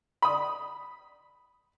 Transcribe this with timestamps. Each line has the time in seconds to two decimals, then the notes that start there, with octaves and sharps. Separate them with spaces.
0.22 B5 D#6